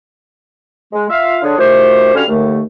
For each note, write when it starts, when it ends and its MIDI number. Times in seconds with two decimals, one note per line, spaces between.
0.92 1.05 56
1.10 1.37 65
1.10 1.37 76
1.10 1.37 77
1.42 1.54 50
1.42 1.54 62
1.42 1.54 68
1.42 1.54 73
1.58 2.12 51
1.58 2.12 53
1.58 2.12 57
1.58 2.12 66
1.58 2.12 67
1.58 2.12 72
2.14 2.23 50
2.14 2.23 55
2.14 2.23 61
2.14 2.23 66
2.14 2.23 77
2.14 2.23 89
2.28 2.61 39
2.28 2.61 50
2.28 2.61 57